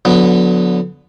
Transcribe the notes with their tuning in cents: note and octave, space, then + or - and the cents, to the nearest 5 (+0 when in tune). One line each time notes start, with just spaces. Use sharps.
D3 -15 F#3 -35 B3 +0